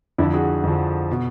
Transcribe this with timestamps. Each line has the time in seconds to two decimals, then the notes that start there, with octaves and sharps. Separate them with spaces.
0.18 F2 D3 F3 D4 E4
0.33 F#4 G#4
0.63 F2 D3 F3
1.12 B2